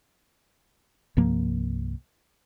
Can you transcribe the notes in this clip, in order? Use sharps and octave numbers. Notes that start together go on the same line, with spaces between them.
C2 G2 F3 A#3